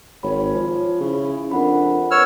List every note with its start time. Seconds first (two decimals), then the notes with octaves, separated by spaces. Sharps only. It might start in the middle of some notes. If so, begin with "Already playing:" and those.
0.23 G#1 C#5 B5
0.55 F3
1.01 C#3 E4
1.51 F2 D4 A#4 F#5 B5
2.11 B4 C#5 E6 F6